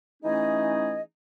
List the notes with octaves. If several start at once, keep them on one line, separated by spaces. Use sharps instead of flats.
E3 A3 C#4 D#4 G#4 D#5